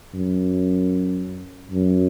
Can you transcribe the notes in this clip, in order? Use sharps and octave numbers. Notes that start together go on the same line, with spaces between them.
F#2
F#2